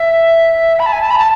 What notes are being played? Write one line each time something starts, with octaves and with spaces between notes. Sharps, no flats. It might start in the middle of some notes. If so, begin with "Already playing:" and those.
Already playing: E5
B5
A5
G#5
A5
B5
A5